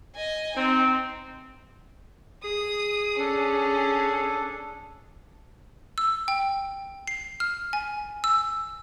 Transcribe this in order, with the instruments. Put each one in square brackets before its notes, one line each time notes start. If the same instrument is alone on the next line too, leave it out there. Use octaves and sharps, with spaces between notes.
[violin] D#5 G#5
[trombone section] C4 [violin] D#4
[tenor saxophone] G#4 [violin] D#6
[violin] C#4 [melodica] D4 A4
[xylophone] E6
G5
C7
F6
G#5
E6